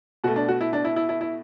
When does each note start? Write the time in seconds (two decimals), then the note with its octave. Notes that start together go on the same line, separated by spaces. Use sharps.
0.24 B2 A3 F#4
0.36 D4
0.49 F#4
0.61 E4
0.73 D4
0.85 E4
0.96 E4
1.09 E4
1.21 E4